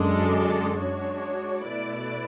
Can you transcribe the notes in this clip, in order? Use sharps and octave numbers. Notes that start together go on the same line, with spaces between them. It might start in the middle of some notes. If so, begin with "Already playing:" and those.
Already playing: F#2 D3 G#3 D4 A4
G#3 D4 F#4 C#5
B2 A3 E4 B4 D5